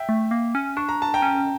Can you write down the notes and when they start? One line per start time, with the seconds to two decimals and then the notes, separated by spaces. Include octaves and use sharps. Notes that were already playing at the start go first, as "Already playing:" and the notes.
Already playing: E5 G5
0.09 A3
0.31 A#3
0.55 C#4
0.77 D4 C#6
0.89 A#5
1.02 A5
1.14 G5 A#5
1.22 C#4